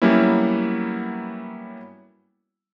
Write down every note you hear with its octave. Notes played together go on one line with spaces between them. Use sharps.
F#3 G3 A#3 B3 C#4 E4